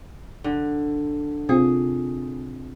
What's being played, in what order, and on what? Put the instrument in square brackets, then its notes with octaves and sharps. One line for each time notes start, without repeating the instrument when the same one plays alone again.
[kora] D3
[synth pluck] C3 C4 F4 [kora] G#4